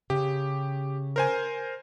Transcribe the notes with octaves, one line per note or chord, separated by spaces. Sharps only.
C#3 G4
A#4 C5 G#5